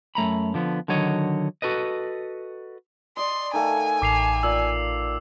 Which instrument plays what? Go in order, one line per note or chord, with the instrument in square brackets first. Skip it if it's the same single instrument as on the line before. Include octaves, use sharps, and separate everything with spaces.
[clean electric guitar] F#2 A3 A#5 B5
D3 F3 B3
D3 D#3 F#3 C#5 D#5
F#4 A4 B4 D#5
[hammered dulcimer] D5 D#5 [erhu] C6
[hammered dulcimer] D#3 A3 F5 [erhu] G#5
[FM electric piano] A1 [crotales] D6 C7 F7
[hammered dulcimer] A#2 [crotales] E6